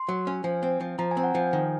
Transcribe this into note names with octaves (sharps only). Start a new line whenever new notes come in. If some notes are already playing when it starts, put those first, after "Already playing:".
Already playing: C6
F#3
C#4
F3 G#5
C4
F3
F3 A#5
G#5
C4
F#5
F3 G#5
D#3